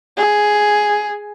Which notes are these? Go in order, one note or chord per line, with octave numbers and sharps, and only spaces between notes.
G#4